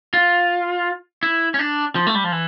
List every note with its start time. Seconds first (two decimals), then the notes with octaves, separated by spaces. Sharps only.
0.14 F4
1.23 E4
1.54 C#4
1.59 D4
1.95 F3
2.07 A3
2.15 G3
2.24 F3
2.32 E3